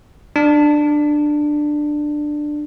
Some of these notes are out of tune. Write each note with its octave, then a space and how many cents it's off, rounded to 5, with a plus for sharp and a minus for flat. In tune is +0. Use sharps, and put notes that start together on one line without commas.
D4 +15